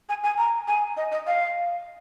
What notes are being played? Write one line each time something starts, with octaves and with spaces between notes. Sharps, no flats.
G#5
G#5
A#5
G#5
D#5
D#5
F5